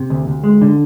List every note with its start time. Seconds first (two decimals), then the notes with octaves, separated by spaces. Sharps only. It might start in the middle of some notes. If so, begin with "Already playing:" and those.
Already playing: C3
0.10 D2
0.27 D2
0.44 G#3
0.61 D3